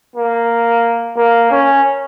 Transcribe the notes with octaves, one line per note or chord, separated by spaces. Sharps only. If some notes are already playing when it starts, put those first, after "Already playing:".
A#3
A#3
C#4